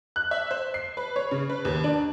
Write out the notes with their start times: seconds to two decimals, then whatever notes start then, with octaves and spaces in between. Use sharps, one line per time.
0.16 F#6
0.31 E5
0.51 C5
0.74 C7
0.97 B4
1.16 C#5
1.31 C#3
1.49 B4
1.65 D#2
1.84 D4